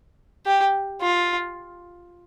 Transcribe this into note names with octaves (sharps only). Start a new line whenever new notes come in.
G4
F4